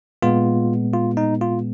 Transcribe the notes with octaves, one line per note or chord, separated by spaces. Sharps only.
A#2 G#3 B3 F4
F4
D#4
F4